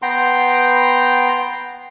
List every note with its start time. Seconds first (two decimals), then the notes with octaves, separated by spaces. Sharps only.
0.02 B3 G5 A#5 C6